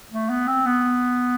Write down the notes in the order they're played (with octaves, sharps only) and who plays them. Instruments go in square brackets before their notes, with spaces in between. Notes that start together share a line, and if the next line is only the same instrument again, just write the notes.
[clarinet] A3
B3
C4
B3